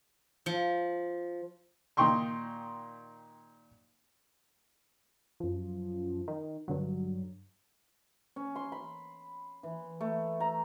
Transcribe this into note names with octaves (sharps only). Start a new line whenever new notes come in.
F3
A#2 D#3 D#4 G5 C6 C#6
F#2 F3
D#3
G2 D3 F#3
C#4
C6
B5
E3
A3
A#5